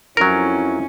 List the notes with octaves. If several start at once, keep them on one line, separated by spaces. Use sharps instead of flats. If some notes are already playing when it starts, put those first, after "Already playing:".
F2 F#3 C#4 E4 A#4